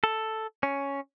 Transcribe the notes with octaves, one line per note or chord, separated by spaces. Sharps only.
A4
C#4